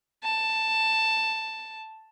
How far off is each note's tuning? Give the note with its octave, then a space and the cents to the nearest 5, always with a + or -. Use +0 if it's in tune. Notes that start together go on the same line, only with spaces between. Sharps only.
A5 +5